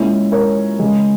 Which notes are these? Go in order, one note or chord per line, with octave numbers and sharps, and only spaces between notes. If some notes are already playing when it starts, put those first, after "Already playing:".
Already playing: A#2 G#3 C#4 E4
A#4 C#5
C#3 G#3